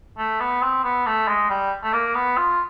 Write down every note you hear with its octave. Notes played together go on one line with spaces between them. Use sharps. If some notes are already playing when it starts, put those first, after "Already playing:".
A3
B3
C4
B3
A3
G#3
G3
A3
A#3
B3
F4